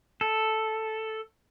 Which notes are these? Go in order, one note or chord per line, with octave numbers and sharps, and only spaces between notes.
A4